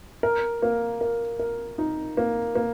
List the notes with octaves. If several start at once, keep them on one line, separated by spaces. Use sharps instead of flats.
A#4
A#3
A#4
A#4
D#4
A#3
A#3